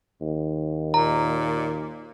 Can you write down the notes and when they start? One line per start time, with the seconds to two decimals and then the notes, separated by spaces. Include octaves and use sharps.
0.21 D#2
0.94 A#2 A#5